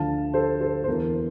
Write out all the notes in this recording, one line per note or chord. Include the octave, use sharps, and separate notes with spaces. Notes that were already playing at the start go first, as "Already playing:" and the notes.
Already playing: D2 D3 F3 F5 A5
A4 C5
A4 C5
C5
E2 E3 A#4